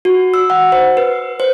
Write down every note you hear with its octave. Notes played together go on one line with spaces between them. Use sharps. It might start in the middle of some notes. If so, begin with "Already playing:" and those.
F#4
E6
F#5
C5
B4
C5